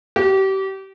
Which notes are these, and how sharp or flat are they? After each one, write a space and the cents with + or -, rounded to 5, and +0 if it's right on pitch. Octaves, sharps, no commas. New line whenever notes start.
G4 -30